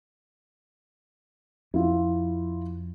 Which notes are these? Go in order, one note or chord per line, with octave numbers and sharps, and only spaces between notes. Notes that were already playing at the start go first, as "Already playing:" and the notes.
F2 E4 F4